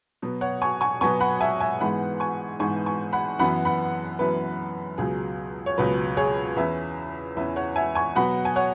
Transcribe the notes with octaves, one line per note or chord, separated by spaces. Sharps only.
B2 F#3 B3
C#5 F#5
G#5 C#6
G#5 C#6
B2 F#3 B3 G#5 C#6
F#5 B5
E5 G#5
E5 G#5
G#2 E3 G#3 B3 F#5 B5
G#5 C#6
G#2 E3 G#3 B3 G#5 C#6
G#5 C#6
F#5 B5
F#2 E3 B3 F#5 B5
F#5 B5
F#2 E3 B3 B4
C#2 B2 F#3 G#4
C#5
C#2 B2 F#3 B4
G#4 C#5
E2 E3 C#4 B4 E5
E2 E3 C#4 B4 E5
C#5 F#5
E5 G#5
G#5 C#6
B2 F#3 B3 F#5 B5
G#5
C#5 F#5